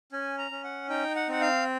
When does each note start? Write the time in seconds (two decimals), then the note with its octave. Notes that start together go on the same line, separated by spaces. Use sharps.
0.12 C#4 G#5
0.38 A#5
0.51 C#4
0.64 F#5
0.89 D#4 G5
1.15 F#5
1.28 C4 F#5
1.41 F5